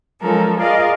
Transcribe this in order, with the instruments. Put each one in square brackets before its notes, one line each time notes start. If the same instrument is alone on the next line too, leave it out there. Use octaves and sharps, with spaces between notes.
[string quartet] F3 F#3 G#3 C#4 A4 A#4
F4 G#4 A#4 D5 D#5 F5